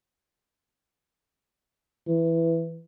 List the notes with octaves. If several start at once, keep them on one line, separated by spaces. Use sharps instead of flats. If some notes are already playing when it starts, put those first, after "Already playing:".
E3